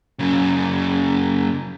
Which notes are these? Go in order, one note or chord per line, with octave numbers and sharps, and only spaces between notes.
F#2 C#3